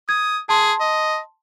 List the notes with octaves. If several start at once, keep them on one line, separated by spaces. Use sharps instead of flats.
D#6 G#6
G#4 A5 C6
D#5